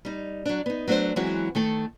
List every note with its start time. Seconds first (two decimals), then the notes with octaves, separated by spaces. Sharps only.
0.05 G3 D#4
0.46 F#3 D4
0.66 B3 D#4
0.88 F#3 A3 D4 A#4 C5
1.16 E3 F#3 G#3 C4 E4 F#4
1.55 D#3 A3 A4